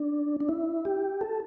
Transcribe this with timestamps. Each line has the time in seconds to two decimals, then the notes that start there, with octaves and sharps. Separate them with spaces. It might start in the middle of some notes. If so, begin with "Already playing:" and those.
Already playing: D4
0.40 D4
0.49 E4
0.85 G4
1.21 A4